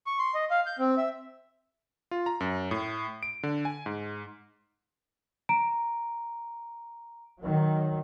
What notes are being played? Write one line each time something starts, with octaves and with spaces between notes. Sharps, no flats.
C#6
C6
D#5
F5
G6
C4
E5
F4
A#5
F#2
A2
D7
D3
G#5
G#2
A#5 D7
D#3 F#3